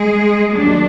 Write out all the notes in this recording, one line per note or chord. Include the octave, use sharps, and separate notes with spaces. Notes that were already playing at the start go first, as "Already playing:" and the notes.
Already playing: G#3 G#4
D#2 D#3 F#3 D4